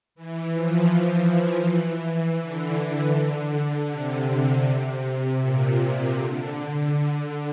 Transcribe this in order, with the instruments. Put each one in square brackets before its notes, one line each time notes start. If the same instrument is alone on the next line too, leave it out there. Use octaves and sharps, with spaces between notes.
[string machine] E3
F3
E3
D3
C3
A#2
C3
D3